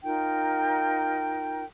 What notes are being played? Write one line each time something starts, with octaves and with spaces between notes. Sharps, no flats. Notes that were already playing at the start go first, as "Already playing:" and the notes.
D#4 F4 A#4 G5